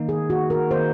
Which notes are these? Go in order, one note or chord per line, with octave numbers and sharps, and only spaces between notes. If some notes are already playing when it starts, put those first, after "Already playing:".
Already playing: D#3 A#3 D#4
G#4
F#4
A#4
D#3 A#3 D#4 C5